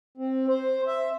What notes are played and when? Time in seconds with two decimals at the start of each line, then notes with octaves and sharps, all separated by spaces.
0.17 C4
0.48 C5
0.87 E5